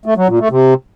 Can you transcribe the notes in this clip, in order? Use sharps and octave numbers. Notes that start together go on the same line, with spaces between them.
A3
F#3
A#2
A3
C3